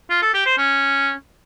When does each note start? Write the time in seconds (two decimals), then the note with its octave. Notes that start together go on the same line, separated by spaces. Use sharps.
0.10 F4
0.22 A4
0.34 G4
0.46 C5
0.58 C#4